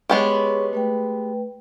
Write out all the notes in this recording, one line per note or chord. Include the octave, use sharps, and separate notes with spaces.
G#3 B3 G4 G#4 C#5 C#6
A3 B4 G5